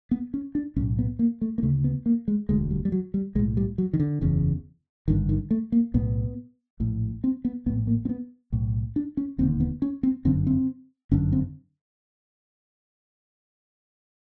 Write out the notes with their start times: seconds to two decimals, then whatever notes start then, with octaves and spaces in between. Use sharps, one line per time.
0.11 B3
0.34 C#4
0.55 D4
0.76 B1 C#4
0.80 A2
0.99 B3
1.19 A#3
1.41 A3
1.58 A#3
1.63 D2 C#3 A3
1.84 B3
2.06 A#3
2.28 G#3
2.49 E1 D2 D3 G#3
2.71 G3
2.85 G3
2.92 F#3
3.14 G3
3.35 B1 G#3
3.39 A2
3.57 G3
3.78 F#3
3.93 D#3
4.00 D3
4.21 F#1 E2 C#3
5.08 G#1 G2 D3 D#3
5.29 D#3
5.51 A3
5.72 A#3
5.94 B1 A2 B3
6.80 A#1 A2
7.24 C4
7.45 B3
7.66 A#1 A2 B3
7.87 A#3
8.05 C4
8.09 B3
8.52 B1 A2
8.96 D4
9.17 C#4
9.38 E1 D#2 D3 C4
9.60 B3
9.82 C#4
10.03 C4
10.25 G1 F#2 D3 C4
10.47 C4
11.11 G1 F#2 D3 C#4
11.32 C4